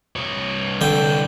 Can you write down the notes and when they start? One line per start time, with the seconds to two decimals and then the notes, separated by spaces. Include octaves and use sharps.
0.16 C2 C#5
0.81 D3 G5